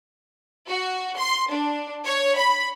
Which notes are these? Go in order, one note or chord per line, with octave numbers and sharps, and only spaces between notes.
F#4
C6
D4
C#5
B5